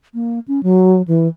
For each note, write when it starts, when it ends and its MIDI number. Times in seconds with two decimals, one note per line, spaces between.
0.14 0.40 58
0.48 0.63 61
0.63 1.02 54
1.08 1.28 52